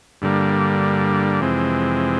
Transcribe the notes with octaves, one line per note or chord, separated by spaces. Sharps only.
G2 D3 G3 A#3
F2 C3 E3 G#3 C4